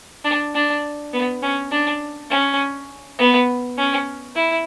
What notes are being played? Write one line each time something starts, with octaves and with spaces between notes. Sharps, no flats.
D4
D4
B3
C#4
D4
C#4
B3
C#4
E4